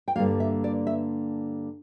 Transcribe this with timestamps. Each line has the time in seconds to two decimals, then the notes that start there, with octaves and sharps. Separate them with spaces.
0.08 G5
0.16 G2 D3 G3 A#3 F5
0.40 E5
0.64 D5
0.87 E5